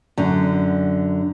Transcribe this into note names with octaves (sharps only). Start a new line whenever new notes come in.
F#2 D3